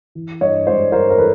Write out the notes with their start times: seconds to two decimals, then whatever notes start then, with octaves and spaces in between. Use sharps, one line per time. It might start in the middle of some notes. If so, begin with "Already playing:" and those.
0.15 E3
0.41 G2 C#5 D#5
0.67 G#3 C5 D5
0.92 G2 A#4 C5
1.10 A#4
1.18 E3 A4 B4